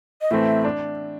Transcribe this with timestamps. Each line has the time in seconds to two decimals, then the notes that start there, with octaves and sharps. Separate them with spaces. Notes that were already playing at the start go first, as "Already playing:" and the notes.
0.21 D#5
0.31 A2 E3 A3 C4 E5
0.65 D4